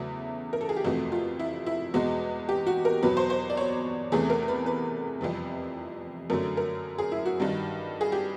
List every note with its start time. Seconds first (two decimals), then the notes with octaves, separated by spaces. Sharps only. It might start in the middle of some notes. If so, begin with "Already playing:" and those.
Already playing: E2 C#3 F#3 A3 E4
0.53 A#4
0.61 A4
0.69 G#4
0.76 G4
0.85 F2 C3 E3 A3 F#4
1.12 F4
1.39 E4
1.66 E4
1.94 E2 B2 G#3 F#4
2.49 G4
2.67 F#4
2.85 A#4
3.03 E2 B2 F#3 B4
3.17 C5
3.30 C5
3.50 D5
3.57 C#5
4.12 E2 C3 E3 A3 G#4
4.30 A#4
4.48 B4
4.66 B4
5.21 F2 C3 E3 G3
6.30 F#2 D3 F#3 A3 A#4
6.57 A#4
6.98 G#4
7.12 E4
7.26 F#4
7.40 G2 D#3 G3
8.01 G#4
8.12 G4